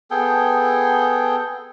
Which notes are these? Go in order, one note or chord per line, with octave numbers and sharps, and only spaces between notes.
B3 G#4 A4 G5